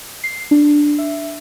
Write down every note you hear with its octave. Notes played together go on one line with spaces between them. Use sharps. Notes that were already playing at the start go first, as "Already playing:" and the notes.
C7
D4
E5